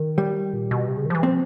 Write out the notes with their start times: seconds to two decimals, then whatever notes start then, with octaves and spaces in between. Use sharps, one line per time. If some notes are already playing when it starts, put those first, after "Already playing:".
Already playing: D#3
0.18 G3
0.53 A#2
0.71 B2
0.88 C3
0.97 C#3
1.06 D#3
1.10 F3
1.15 E3
1.23 F3 C4